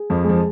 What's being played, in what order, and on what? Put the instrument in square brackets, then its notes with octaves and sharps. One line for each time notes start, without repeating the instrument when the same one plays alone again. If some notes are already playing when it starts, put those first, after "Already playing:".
Already playing: [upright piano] G#4
[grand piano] F2 F3
[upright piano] G#3
[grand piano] F3